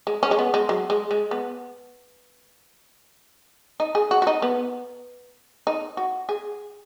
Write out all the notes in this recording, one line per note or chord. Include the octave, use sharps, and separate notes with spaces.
G#3
C#4
G#3
B3
G#3
F#3
G#3
G#3
B3
D#4
G#4
F#4
F#4
D#4
B3
D#4
F#4
G#4